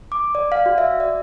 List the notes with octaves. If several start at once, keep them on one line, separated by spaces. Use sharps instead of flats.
D6
D5
F5
F#4
E5
D5